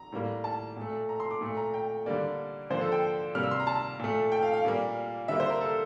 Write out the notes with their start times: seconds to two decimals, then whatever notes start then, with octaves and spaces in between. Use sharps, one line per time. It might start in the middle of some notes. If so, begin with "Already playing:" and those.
Already playing: A#5
0.12 A2 G3 A#3
0.44 A5
0.76 A#2
0.81 A3
1.09 A#5
1.20 C6
1.31 D6
1.41 A#2 A3
1.57 A#5
1.74 G5
2.06 D3 G3 A#3 D5
2.70 D3 F3 A#3 C5
2.81 A4
2.92 G5
3.35 C3 G3 A#3 F6
3.43 E6
3.51 C6
3.60 A#5
3.67 A5
3.99 A#2 A3
4.32 G5
4.43 F5
4.53 F5
4.65 A#2 G3 A#3
5.28 D3 G3 A#3 E5
5.40 C5
5.50 A#4
5.61 A4